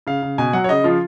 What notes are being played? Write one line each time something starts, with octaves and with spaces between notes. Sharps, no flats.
C#3 F5
C#3
B2 G#5
F#3 F#5
C#5
C#3 D#5
F3 F4